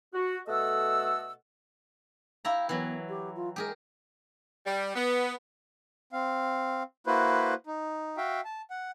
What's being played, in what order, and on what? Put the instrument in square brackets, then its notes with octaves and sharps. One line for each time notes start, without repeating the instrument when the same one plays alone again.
[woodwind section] F#4
B2 A3 A4 D#5 F#5 E6
[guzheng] E4 G4 A#5 [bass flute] F5
[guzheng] E3 F#3 [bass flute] B3
[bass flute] G4
F4
[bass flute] G#3 [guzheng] G4 G#4 A#4
[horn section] G3
B3
[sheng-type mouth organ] C4 F5
A#3 E4 F#4 B4 C5
D#4
F#4 E5 F5 G5
A5
F#5